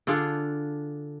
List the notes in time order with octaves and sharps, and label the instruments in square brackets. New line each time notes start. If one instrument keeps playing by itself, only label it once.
[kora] D3 D4 F4 G#4